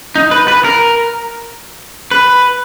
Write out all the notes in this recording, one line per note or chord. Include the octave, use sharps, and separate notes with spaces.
D#4
B4
B4
A#4
B4